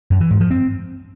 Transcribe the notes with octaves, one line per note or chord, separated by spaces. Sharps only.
F#2
E3
G#2
F3
C4